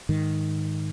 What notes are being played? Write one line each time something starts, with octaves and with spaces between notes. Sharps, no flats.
G#2 D#3